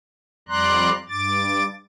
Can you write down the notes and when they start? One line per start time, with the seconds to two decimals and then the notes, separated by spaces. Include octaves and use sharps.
0.49 F2 G3 D5 A#5 C6 F#6
1.09 G2 D6 A6